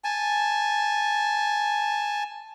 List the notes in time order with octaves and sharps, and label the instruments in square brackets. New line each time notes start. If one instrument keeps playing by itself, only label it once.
[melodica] G#5 A5